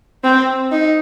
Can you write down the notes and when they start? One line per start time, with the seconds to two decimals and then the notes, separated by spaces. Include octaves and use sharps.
0.24 C4
0.72 D#4